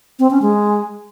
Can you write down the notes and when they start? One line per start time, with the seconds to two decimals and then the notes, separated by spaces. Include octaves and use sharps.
0.19 C4
0.31 C#4
0.42 G#3